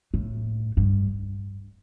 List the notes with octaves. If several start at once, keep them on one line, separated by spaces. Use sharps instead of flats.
A2
G2